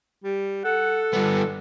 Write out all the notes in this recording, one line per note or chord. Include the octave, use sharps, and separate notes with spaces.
G3
A4 F#5
G2 B3 D4